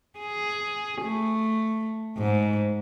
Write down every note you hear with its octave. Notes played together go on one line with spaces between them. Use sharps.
G#4
A3
G#2